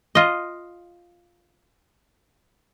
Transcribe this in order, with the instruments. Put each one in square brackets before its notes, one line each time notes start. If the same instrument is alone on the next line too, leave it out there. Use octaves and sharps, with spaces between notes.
[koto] F4 D#5